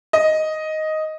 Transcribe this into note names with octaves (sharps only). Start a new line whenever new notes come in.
D#5